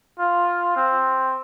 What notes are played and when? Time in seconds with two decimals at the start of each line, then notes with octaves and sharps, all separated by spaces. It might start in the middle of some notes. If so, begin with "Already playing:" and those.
0.19 F4
0.76 C4